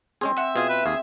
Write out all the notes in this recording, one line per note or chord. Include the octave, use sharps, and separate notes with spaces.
G#3 C4 C#4 G#4
E5 F#5
B2 F4 G#4
B4
D#2 G#4 F5